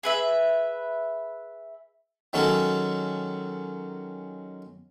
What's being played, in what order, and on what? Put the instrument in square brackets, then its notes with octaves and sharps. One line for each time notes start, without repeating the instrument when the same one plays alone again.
[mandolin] G#4 B4 E5
[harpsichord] D#3 F#3 G#3 C#4 F#4 A4